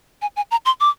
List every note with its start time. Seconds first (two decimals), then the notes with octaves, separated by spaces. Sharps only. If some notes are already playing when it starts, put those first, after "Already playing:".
0.22 G#5
0.36 G#5
0.51 A#5
0.65 C6
0.80 D6